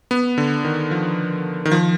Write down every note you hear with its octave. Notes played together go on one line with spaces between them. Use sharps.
B3
D3
D#3
F3
D#3
F3